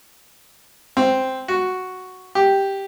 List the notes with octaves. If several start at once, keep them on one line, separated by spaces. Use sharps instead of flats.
C4
F#4
G4